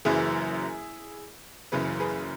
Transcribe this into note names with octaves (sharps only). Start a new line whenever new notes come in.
F#1 F#2 E3 E4 G#4
F#1 F#2 C#3 E3 G#4 B4
G#4 B4